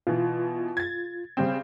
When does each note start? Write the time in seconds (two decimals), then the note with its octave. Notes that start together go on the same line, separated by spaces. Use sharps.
0.07 B2 E3 F4
0.77 G#6 A6
1.37 C#3 G3 C4